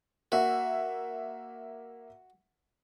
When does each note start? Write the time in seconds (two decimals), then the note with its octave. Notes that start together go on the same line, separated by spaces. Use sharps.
0.32 A#3 F#4 E5